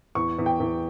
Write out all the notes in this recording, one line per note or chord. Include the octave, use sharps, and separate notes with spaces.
E2 C#6
E2
G5
E2